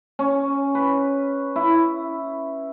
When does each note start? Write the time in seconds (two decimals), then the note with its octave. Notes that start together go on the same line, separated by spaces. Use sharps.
0.19 C#4
0.75 B4
1.56 E4